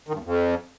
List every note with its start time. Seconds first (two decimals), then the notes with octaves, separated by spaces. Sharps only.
0.09 D#3
0.14 G2
0.19 E2
0.24 F2